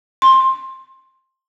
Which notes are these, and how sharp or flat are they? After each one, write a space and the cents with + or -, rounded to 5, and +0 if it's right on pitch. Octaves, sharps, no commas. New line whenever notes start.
C6 +15